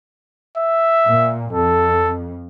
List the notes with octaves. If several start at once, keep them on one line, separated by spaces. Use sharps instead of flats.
E5
A#2
F2 A4